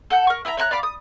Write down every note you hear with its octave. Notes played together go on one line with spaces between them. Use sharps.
A4 F#5 G6
A#4 C#6
E4 E5 G#5 A#5
C#5 E5 A#5 F#6
D5 F5 B5 D6
D#6